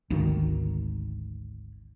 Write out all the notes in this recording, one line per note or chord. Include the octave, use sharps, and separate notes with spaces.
G#1 D2 D#3